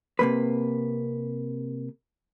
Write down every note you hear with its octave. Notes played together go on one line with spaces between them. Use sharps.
C3 A#3 B4